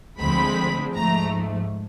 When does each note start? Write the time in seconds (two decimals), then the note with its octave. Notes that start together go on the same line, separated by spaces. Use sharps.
0.19 D2 D3 F3 G#3 C4 B5
0.94 G#2 F3 A3 A#5